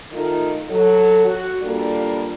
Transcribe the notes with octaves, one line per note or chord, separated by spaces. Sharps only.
D#3 A3 D#4 F4
F#3 A4
F#4
G3 A#3 D4 F4 A4